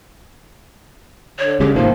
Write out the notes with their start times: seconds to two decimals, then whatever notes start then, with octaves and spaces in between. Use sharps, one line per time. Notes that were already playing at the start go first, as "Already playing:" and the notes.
1.39 D3 C#5
1.60 C#3 G#3 G4
1.75 G#1 C3 D#3 F3 A#3